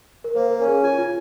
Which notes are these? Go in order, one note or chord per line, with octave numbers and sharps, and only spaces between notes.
A#4
A#3 C5
A#4
C#4
G#4
F4 G#5
F4